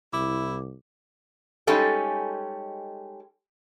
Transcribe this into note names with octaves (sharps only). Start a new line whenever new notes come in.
C2 E4 D6
G3 G#3 C#4 D#4 G4 A4